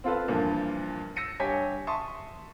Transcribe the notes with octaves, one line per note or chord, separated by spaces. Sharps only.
C4 F4 A4 B4
G2 A#2 E3 F3
E6 A#6 C#7 D#7
G2 G4 C#5 G#5 B6
E5 A5 C6 C#6 D#6